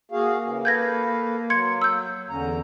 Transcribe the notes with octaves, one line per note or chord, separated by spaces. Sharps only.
A#3 F#4 G#4 F5
C#3 E3
A4 B4 F5 G6 G#6 A#6
F#3 C6 G#6 C#7
E6 G6
E2 D3 C#4 A#5